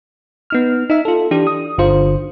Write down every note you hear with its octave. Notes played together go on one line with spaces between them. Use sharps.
B3 D#4 F6
D#4 E5
F4 A4
E3 D4 G4
D#6
G1 D3 F4 C5